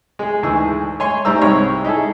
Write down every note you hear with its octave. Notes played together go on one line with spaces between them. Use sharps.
G#3 G#4
D2 G#2 E3 G#4 E6
C#5 G#5 C6 C#6
G#2 G3 C5 A#5 E6
C2 G#2 C#5
D#4 E4 G#4 A4